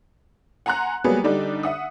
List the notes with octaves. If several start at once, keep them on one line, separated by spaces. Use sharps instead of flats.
F#5 G#5 A#5 C6 F#6
F#3 G3 A#3 B3 G#4
D3 G3 D4 D#4
E5 F#5 D#6